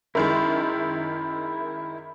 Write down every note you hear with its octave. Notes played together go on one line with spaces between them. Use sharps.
F#2 D#3 G#3 E4 A#4